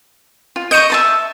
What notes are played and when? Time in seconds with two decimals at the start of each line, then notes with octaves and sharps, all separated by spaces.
0.56 F4
0.71 D#5 C#6 G6 C#7 D#7
0.90 E5 A5 C6